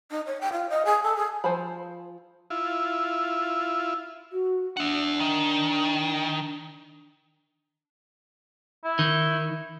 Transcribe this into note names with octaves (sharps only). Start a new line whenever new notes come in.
D#4
C#5
G5
F4
D#5
G#4
A4
G#4
F3 C5 G#5 A5 B5
E4 F4
F#4
D4 E5 F#5
D#3
E4
D#3